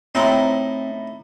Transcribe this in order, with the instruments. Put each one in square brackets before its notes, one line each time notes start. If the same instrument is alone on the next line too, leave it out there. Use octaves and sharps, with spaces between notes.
[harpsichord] A2 D#4 E4 [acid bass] C4